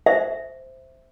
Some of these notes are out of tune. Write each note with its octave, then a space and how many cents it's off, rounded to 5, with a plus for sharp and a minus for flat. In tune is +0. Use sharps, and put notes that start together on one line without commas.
C5 +0 E5 +0